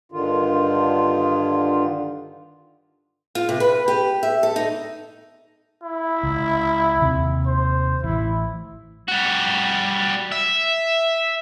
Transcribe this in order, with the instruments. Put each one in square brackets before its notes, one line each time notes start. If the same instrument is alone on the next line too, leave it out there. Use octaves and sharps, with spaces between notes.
[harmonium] G2 D3 D#3 F4
[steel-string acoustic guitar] F4
C3
B4
G4
E5
A4
D#4
[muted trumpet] E4
[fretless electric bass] C#2
D#2 C3 D#3
[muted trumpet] C5
[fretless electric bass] A1 E3 [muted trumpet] E4
[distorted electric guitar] G3 F#4
E5